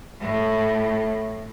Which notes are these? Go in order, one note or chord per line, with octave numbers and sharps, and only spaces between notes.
A2